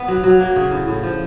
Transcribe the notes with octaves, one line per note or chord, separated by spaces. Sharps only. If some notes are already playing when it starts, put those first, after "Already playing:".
Already playing: B3
F#3
F#3
A#3
C#3
A2
A2
F3